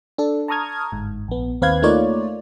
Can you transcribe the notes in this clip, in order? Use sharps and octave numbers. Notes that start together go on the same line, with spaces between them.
D4 A4
A5 A#5 C#6 D#6 F6 G#6
G1 G#2
A#1 B3
D#2 C4 B4 F5 F#6 G#6
A3 A#3 D#4 F4 C#5 D5